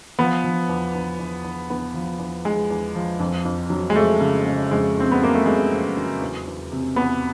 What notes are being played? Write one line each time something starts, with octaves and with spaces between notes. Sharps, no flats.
F3 B3
F3
E2
E2
E2
E2
E2 B3
F3
E2
E2 G#3
E2
F3
F2
F2
F#3
G#3
F2 A3
C#3
C#3
F2 G#3
F2 C4
B3
F#3 A#3
A3
F2 G#3
F2
F#3
E2
E2
C3
E2 B3